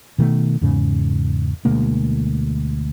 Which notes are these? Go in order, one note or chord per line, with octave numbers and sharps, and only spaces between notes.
B2 D#3 A3
E2 G#2 C#3
D2 B2 G#3 A#3